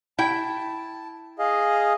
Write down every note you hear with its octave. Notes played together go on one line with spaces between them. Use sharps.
E4 G5 A5
G#4 D#5 F5